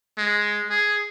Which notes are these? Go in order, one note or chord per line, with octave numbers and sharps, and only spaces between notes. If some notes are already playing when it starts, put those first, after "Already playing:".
G#3
G#4